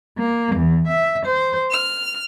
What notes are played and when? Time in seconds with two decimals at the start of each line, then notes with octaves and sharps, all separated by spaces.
0.18 A#3
0.56 E2
0.87 E5
1.26 C5
1.71 F6